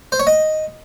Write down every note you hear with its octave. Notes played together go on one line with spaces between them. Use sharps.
C5
C#5
D#5